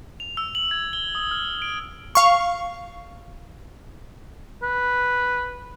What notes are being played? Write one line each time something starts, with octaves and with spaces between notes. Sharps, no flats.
F7
E6
F#7
G#6
G7
D#6
F6
D7
F5 C#6
B4